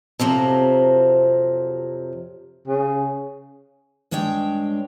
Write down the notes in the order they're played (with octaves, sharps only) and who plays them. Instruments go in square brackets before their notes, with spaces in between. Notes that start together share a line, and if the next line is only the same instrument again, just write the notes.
[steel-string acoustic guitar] F2 C3 F3 F#3
[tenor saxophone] C#3
[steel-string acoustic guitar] G2 G#3 D4 C#5 G5